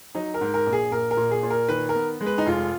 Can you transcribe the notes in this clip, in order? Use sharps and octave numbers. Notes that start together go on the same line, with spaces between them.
F#3 D#4
A#4
G#2
A#4
A#1
G#4
A#1 A#4
A#4
A#2
G#4
A#2
A#4
D#3 B4
A#4
B3
G#3
B4
D#4
F1 F4